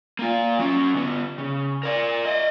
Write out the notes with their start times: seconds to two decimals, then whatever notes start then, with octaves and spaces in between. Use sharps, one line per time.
0.19 A#3 F4
0.59 F#3 C#4
0.94 D3 B3
1.38 C#3
1.83 A#4 D5
2.25 D5 D#5